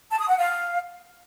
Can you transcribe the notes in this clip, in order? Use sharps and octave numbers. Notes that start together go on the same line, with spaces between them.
A5
D#6
F#5
F5